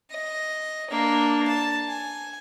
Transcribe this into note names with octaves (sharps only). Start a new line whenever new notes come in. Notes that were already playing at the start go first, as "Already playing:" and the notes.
D#5
A#3 D4
A5
G#5